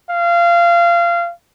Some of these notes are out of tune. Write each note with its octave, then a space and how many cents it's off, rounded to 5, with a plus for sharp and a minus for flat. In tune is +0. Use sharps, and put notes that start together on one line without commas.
F5 -25